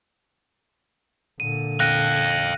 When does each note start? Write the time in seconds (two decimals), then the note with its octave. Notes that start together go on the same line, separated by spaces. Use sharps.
1.40 A#2 D3 D#7
1.80 F5 G5 F#6 A#6 D#7